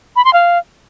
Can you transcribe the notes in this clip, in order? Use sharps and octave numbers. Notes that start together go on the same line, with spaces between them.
B5
C6
F5